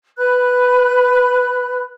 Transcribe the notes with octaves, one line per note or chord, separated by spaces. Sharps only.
B4 B5 F#6